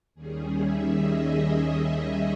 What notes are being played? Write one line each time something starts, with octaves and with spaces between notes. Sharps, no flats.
D#2 D#3 G3 C#4 G#4
E5
D#5